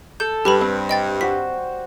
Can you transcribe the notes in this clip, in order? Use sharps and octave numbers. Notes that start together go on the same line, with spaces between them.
A4 G6
G2 G3 G4 B4 B5
C4
D#5 G5 A6
F#4 C5 B6